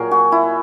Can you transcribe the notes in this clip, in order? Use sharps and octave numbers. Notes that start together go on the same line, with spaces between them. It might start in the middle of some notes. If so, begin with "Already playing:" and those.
Already playing: A#2 F#3 G#4 A#4
F#4
E4